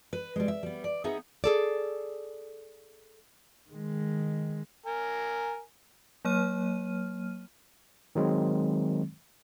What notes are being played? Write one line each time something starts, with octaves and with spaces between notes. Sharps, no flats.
B4
G3 G#3
E5
G3 B3
D5
B3 D#4 G#4 E5 F#5
G#4 A4 D5
D#3 G#3
A#4 G#5
F#3 A#3 C#5 F6 D#7
D#3 F#3 G#3 C4